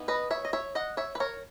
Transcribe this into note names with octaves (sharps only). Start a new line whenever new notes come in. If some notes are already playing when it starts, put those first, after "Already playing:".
Already playing: E3 B3 D#4
B4 D#5
C#5 E5
D#5
C#5 E5
D#5 F#5
C#5 E5
B4
A#4 C#5